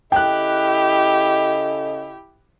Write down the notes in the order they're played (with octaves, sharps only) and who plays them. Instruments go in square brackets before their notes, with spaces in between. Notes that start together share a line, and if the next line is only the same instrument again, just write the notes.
[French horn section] C#3 A4 D#5 [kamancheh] E4 G4 [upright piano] G5 F#6